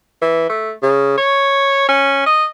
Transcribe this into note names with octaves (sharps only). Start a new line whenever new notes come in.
E3
A3
C#3
C#5
C#4
D#5